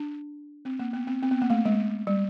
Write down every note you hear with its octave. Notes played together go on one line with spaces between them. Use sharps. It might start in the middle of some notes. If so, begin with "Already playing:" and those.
Already playing: D4
C4
A#3
B3
C4
C4
B3
A#3
A3
G#3
G3